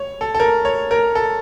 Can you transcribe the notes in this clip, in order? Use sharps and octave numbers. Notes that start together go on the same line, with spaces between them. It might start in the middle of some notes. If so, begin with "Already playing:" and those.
Already playing: C#5
A4
A4
A#4
C#5
A#4
A4